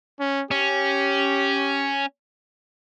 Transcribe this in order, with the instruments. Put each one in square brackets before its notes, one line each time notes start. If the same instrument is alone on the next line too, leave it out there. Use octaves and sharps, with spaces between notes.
[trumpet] C#4
[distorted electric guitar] C#4 [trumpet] G4